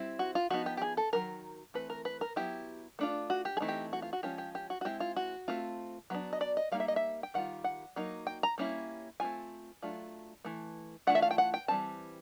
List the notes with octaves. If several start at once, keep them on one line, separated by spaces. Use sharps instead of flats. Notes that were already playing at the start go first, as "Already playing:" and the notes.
Already playing: G3 C4 E4
F#4
F4
F3 G#3 B3 D#4 F#4
G4
G4
G#4
A4
D#3 F#3 A#4
E3 A3 C4 B4
A#4
B4
A#4
F#3 B3 E4 G4
A3 D4 F4
F#4
G4
G#4
E3 A3 C4 D#4
G4
F#4
F4
F#4
F3 G#3 C#4 F4 G4
G4
G4
F#4
F#4
G#3 C4 E4 G4
F4
F#4
A3 C4 F4
F#3 B3 D4
D#5
D5
D#5
G3 A#3 D#4 F5
E5
D#5
E5
G5
D#3 G3 F4 F#5
F#5
F#3 A#3 D#4
G5
A#5
G3 A#3 C#4 E4
A3 C4 F4 G#5
F#3 A3 D4 F4
E3 A3
E3 A3 D4 F4 F#5
E5
F5
G5
F#5
G5
E3 G3 C4 A5